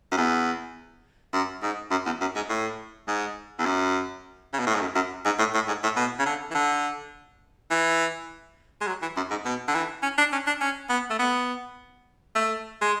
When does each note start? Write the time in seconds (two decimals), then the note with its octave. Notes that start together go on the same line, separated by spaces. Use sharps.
0.12 F#2
0.17 E2
1.33 F#2
1.62 G#2
1.91 F#2
2.06 E2
2.21 F#2
2.35 G#2
2.49 A2
3.08 G#2
3.58 E2
3.65 F#2
4.53 C#3
4.59 B2
4.67 A2
4.75 G#2
4.81 F#2
4.95 F#2
5.25 G#2
5.38 A2
5.54 A2
5.67 G#2
5.83 A2
5.96 B2
6.19 C#3
6.26 D3
6.51 E3
6.54 D3
7.70 E3
8.81 G#3
8.87 F#3
9.02 E3
9.16 F#2
9.30 G#2
9.45 B2
9.68 D3
9.74 E3
10.03 C#4
10.18 D4
10.32 C#4
10.47 D4
10.61 C#4
10.89 B3
11.10 A3
11.19 B3
12.35 A3
12.81 G#3